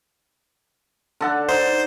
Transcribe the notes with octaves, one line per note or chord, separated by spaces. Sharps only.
D3 A4 F#5
D#4 C5